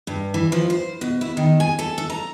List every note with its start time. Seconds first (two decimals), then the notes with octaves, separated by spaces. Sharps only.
0.07 G2
0.34 E3
0.52 F3
0.70 C5
1.01 B2
1.21 E4
1.37 D#3
1.60 G#5
1.79 A4
1.98 A4
2.10 A#5